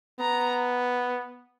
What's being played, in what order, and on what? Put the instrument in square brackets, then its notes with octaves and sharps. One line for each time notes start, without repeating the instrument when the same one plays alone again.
[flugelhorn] B3 [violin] A#5